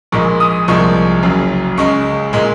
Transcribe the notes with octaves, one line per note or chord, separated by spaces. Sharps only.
A#1 A#2 G#3 C#6
D#6
C2 A#2 F3 G#3 C#6
F#1 F#2 C#3 F#3
C#2 C#3 G#3 C#6
A#2 G#3